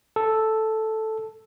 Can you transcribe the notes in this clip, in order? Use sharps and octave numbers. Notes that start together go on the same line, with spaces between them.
A4